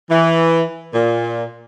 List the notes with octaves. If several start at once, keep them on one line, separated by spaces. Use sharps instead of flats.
E3
A#2